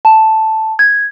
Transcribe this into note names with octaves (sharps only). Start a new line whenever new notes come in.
A5
G#6